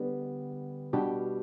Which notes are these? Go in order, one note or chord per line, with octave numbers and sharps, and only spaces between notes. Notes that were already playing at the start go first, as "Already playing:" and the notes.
Already playing: D3 G3 B3
B2 G3 D4 G4